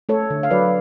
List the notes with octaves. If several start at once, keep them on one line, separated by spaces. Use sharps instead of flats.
A3 A4 C#5
D3
F5
F#3 B4 D5